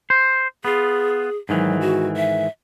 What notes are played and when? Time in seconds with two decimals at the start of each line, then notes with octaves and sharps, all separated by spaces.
0.10 C5
0.65 B3 F4 G#4
1.49 G#2 D#3 E3 F#3
1.81 F#4
2.16 E5